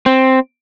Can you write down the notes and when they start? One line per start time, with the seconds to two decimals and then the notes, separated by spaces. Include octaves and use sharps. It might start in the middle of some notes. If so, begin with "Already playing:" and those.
0.06 C4